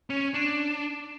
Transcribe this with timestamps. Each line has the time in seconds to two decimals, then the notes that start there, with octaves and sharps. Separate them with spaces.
0.10 C#4
0.34 D4